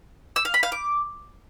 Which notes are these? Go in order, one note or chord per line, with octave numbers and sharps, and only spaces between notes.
E6
F5
B5
F5
D6